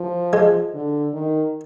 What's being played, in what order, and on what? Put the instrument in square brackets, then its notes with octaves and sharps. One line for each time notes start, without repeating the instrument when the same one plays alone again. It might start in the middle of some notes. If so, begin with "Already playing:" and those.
Already playing: [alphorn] F3
[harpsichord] G#3
[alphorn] D3
D#3